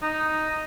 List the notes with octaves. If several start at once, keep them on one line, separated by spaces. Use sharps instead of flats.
D#4